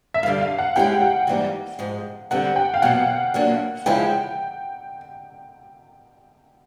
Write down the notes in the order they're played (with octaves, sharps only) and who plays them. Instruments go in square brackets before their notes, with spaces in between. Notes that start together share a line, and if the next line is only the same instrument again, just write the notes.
[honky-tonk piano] E5
[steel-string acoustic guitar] G2 D3 G3 [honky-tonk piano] F5
[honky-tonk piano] F5
F#5
[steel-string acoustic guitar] G#3 C#4 E4 G4 [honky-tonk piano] G5
[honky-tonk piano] F#5
[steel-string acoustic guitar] G#2 E3 G3 A#3 D#4
G#2 F3 G#3
[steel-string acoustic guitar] D3 G3 C4 [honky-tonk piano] F#5
[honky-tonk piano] G5
F5
[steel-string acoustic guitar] E2 B2 F#3 A#3 [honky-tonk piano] F#5
[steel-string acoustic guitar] A#2 F#3 A#3 D4
[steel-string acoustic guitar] C#3 F3 G#3 C#4 E4 [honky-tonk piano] G5